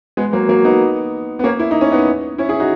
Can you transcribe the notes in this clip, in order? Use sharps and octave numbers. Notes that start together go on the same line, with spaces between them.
G#3 B3
F#3 A#3
F#3 A#3
B3 D#4
B3
A#3 C#4
E4
D#4
C#4
B3 D#4
C#4 E4
E4 G#4
D#4 F#4